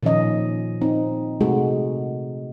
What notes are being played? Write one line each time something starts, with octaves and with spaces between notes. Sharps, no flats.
A#2 D#3 F3 C#4 D#5
C4 D#4
C3 G#3 A3 F#4